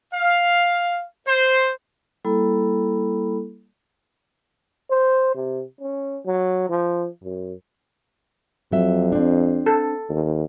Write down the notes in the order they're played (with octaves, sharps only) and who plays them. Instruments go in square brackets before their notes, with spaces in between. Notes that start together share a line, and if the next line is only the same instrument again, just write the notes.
[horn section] F5
C5
[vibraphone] G3 A#3 E4 A4 B5
[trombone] C5
C3
C#4
F#3
F3
F#2
[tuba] F2 [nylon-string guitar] F#3 E5
[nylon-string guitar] C4 D4
[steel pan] A4
[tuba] D#2